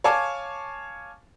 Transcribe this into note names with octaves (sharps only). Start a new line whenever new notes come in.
C#5 F5 G#5 A5 C#6 D6